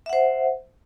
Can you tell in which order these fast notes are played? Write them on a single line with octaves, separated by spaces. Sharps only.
E5 F#5 C5